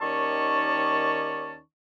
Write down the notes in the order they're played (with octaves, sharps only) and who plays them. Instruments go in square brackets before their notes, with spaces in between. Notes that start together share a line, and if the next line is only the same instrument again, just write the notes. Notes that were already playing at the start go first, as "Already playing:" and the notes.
[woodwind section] D#2 D#3 C#4 D5 A5 C#6